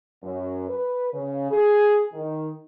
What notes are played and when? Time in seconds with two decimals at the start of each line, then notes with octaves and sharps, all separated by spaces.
0.23 F#2
0.69 B4
1.12 C#3
1.51 G#4
2.13 D#3